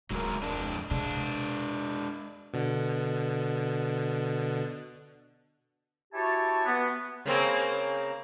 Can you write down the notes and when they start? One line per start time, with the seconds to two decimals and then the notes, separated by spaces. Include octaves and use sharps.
0.11 D1 F#3 G#3 A#4
0.43 F2 G#3 D4
0.91 C3 G#3 D4
2.54 B2 D3
6.13 E4 F#4 G4 C#5 G#5 A5
6.65 B3
7.26 C#3 A#3 C4